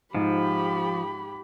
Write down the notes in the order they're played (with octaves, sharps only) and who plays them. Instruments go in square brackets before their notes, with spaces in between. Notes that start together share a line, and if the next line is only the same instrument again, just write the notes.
[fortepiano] G#2 [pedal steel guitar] F3 [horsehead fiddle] G4 B5